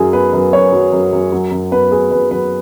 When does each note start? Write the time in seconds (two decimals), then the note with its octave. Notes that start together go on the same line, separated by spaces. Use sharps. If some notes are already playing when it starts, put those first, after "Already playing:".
Already playing: F#2 F#3 G#4
0.13 B3 B4
0.33 F#2 B4
0.53 F#2 C#5
0.73 F#3
0.93 F#2
1.13 F#2
1.32 F#3
1.52 F#2
1.72 B3 B4
1.91 B3 G#4
2.11 F#2 B4
2.31 F#3 B4